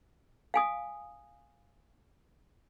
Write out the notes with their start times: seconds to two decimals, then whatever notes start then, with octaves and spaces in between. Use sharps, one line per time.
0.54 F5 G#5 D#6